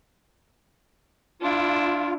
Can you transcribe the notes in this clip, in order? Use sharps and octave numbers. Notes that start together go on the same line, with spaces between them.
D4 E4 F4